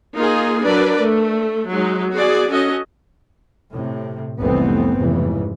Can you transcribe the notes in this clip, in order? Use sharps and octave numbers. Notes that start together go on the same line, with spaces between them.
A#3 D#4 F4 G#4
F#3 D4 A#4 B4 D5
A3
F#3 G#3 D#4
B3 F#4 G#4 D5
C#4 F#4 A4 D#5
A2 C3
F1 C2 E3 A3 B3 C4
F1 G#2 C#3 E3